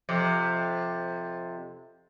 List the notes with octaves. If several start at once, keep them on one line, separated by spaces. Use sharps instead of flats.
F2 C3